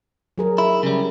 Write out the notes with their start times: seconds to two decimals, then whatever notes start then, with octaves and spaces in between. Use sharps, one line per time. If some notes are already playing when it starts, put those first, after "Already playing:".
0.38 F#3 G#4 A#4
0.58 E4
0.83 C#3 F#3 G3